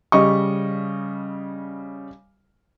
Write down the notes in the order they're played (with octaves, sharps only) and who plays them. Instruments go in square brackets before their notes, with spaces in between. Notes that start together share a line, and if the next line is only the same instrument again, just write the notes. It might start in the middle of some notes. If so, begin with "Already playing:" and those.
[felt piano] C#3 G3 D#5 C#6